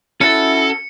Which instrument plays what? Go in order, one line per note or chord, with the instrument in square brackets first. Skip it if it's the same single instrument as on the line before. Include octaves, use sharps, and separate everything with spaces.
[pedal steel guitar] C#4 F#4 A5 [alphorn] E4 [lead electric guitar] A4 [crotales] C#7